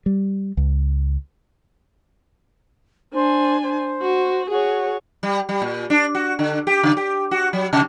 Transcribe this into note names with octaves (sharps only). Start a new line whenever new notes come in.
G3
C#2
D4 C5 G#5
C5
F#4
F#4 G#4 C#5
G3
G3
A#2
D4
F#4
D3
G4
C#3
G4
F#4
F#3
C3